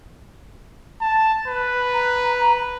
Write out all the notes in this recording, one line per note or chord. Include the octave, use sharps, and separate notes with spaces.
A5
B4
A#5